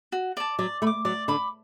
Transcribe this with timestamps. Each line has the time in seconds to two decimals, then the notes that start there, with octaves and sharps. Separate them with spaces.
0.12 F#4
0.37 D5 A5
0.59 F#3 D5
0.82 A3 B5
0.87 D6
1.05 F#3 D5
1.28 D3 B5 D6